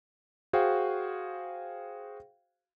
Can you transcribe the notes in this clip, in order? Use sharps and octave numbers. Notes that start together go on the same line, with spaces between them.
F#4 G#4 C5 F5 G5